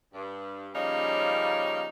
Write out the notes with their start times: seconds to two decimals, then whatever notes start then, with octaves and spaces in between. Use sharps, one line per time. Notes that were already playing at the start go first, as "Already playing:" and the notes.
0.13 G2
0.74 C#3 F3 G3 A#3 C#4 D#4